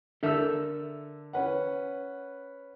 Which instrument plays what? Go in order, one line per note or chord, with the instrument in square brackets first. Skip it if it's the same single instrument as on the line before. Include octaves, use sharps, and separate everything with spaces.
[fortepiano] D3 E6 [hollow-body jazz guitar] A4 A#4 E5
[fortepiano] C#4 B4 F#5